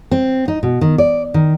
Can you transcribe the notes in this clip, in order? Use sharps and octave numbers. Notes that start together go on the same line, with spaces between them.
C4
D#4
B2
D#3
D5
D#3